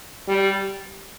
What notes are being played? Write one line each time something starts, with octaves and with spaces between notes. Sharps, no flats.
G3